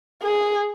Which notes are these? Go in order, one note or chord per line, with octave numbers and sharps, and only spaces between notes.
G#4